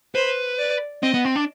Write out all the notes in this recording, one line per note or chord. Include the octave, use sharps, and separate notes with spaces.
B4 C5
D5
C4 D#5
B3
C4
D4